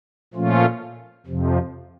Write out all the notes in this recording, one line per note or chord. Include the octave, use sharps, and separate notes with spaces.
A#2 F3 A3 C#4 F4
F2 C3 F3